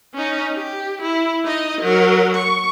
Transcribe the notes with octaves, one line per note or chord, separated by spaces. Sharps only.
C#4 D#4
G4
E4
D#4 D#5
F#3 A#4
C#6